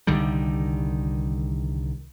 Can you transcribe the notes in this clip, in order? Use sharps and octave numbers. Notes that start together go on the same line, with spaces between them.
C2 D3 D#3 G3